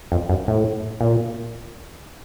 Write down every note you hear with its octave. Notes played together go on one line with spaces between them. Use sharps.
F2
F#2
A2
A#2